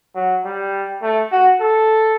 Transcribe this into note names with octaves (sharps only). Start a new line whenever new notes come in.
F#3
G3
A3
F#4
A4